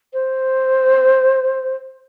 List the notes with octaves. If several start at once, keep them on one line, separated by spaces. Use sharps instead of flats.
C5